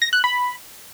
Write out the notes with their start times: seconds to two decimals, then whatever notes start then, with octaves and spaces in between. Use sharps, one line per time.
0.02 A#6
0.13 F#6
0.24 B5